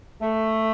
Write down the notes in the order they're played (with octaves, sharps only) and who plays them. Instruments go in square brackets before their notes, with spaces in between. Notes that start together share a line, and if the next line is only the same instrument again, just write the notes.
[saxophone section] A3